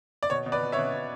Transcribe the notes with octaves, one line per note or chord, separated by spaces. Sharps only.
D5
B2 C#5
B2
B4 D5
B2
C#5 E5
B2
B2